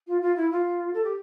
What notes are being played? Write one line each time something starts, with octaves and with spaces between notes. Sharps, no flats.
F4
F4
E4
F4
A4
G4